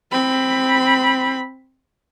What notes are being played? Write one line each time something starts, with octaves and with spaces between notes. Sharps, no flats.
C4 B5